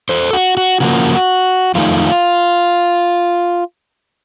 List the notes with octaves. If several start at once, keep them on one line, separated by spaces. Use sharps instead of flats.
A4 C5
F#4
F#4
C#3 F3 A#3 F#4
F2 D#3 A3 D#4 F4